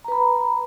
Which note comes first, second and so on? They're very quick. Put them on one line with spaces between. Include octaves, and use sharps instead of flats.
A#5 B4 B5